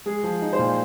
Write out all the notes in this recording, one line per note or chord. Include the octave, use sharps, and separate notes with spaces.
G#3 G#4
F3
D#4
C5
A#2